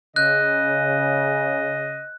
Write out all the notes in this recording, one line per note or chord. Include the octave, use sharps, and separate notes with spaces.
C#3 D#5 F#6 G6